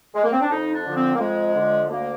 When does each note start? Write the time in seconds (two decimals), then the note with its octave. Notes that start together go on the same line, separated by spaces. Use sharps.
0.15 G#3
0.23 A#3
0.32 C4
0.41 D4
0.49 F2 D#4
0.73 D4
0.85 D3 F3
0.96 C4
1.15 A#3
1.19 F2 G#3
1.55 D3
1.60 F3
1.89 D2 A#3